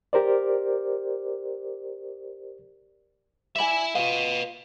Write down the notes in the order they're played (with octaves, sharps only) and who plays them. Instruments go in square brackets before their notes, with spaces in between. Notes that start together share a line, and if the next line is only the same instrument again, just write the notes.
[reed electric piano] G4 A#4 C5 D5
[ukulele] D5 G#5 [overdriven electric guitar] E5 B5
[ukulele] F4 F5 [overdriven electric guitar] B4 D#5